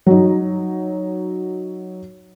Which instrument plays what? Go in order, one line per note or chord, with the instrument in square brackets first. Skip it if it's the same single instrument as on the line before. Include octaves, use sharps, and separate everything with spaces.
[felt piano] F#3 D#4